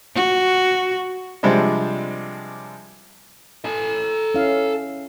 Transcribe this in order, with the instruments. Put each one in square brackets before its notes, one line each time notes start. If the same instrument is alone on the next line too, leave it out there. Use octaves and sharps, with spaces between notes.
[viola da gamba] F#4
[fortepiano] C3 F3 G3 G#3 C4 D4
[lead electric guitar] A4 G#5
[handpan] C#4 E4 F5